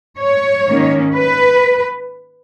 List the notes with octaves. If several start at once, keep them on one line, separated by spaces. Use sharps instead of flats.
C#5
G#2 D#3 A#3 C#4
B4